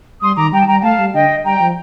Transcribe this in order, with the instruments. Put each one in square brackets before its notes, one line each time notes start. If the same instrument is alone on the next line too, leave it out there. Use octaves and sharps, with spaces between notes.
[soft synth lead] G3 [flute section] C6 D#6
[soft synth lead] D#3 [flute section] A#5 D6
[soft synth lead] G3 [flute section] G5 A#5
[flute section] A5
[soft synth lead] G3 [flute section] G5 A#5
[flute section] G5
[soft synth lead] A3 [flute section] F5 A5
[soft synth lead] G3
[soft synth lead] D3 [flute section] D#5 G5
[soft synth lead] G3 [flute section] G5 A#5
[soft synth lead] F3